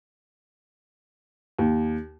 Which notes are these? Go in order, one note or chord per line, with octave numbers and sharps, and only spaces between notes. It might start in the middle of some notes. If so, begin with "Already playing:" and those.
D#2